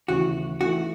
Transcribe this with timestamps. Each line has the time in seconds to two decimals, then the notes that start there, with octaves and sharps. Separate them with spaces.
0.08 D#2 C#3 E3 A3 E4 F#4
0.60 E3 A3 D#4 F#4 A4